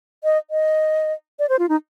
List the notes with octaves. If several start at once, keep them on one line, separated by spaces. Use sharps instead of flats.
D#5
D#5
D5
C5
F4
D#4